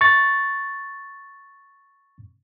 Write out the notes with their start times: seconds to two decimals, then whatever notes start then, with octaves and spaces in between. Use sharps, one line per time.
0.01 C#6 A6